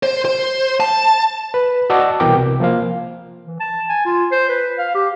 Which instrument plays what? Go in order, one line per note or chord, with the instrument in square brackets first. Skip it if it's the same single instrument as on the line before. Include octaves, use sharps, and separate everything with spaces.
[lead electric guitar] C5
C5
A5
[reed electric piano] B4
F#4 D5 D#5 A5 D6 E6
C2 B2 E3 A#4 G5 D6
C3
F3 A#3 C5 F5
[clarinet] E3
A5
G#5
F4
C5
B4
F5
G4